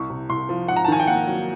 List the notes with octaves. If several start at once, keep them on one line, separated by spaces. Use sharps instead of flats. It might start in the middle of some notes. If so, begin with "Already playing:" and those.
Already playing: C2 C#6
C3
C2 C6
F3
G#2 F#5
A#5
A5
D#3 G#5
G5
A#3 F#5
F#3